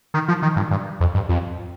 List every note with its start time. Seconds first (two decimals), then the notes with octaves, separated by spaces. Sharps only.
0.14 D#3
0.28 F3
0.42 D#3
0.56 G2
0.71 G2
1.00 F2
1.14 G2
1.29 F2